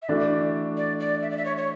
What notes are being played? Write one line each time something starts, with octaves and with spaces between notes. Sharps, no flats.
E5
E3 A3 D4 F#4 A4 D5
D5
D5
E5
D5
E5
C#5
C#5